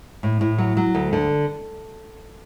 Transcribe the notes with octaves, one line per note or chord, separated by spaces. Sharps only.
A2
A2
F#3
F#3
D2
D3